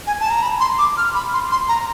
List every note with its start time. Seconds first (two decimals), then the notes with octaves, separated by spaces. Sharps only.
0.07 G#5
0.20 A5
0.30 A#5
0.42 B5
0.60 C6
0.78 D6
0.97 F6
1.15 B5
1.33 C6
1.51 C6
1.68 A#5